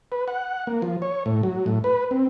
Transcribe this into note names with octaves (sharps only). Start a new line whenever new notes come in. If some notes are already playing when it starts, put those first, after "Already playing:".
B4
F#5
A#3
F3
C#5
A2
F#3
A2
B4
C4